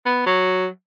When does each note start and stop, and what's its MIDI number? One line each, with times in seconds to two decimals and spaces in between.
0.06 0.23 59
0.26 0.68 54